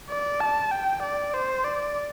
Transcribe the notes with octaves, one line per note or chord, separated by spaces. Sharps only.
D5
A5
G5
D5
C5
D5